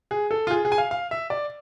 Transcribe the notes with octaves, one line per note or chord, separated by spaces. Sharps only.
G#4
A4
F4
G#4
G#4
G#5
F5
F5
E5
D5